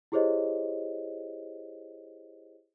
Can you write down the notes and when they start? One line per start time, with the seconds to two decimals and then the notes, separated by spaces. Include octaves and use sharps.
0.12 E4 G4 G#4 C5 C#5 D#5